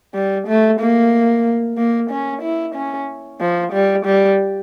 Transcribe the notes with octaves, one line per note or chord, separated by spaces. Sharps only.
G3
A3
A#3
A#3
C#4
E4
C#4
F3
G3
G3